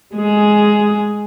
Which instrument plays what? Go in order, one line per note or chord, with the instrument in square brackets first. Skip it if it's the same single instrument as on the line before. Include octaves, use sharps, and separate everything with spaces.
[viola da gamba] G#3 G#4